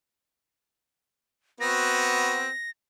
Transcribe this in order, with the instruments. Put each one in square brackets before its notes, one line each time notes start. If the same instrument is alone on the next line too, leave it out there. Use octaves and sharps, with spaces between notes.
[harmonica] B3 C4 F#4 [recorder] A#6